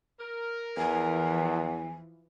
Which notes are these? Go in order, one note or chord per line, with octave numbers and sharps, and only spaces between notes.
A#4
E2 E3 F3 G#5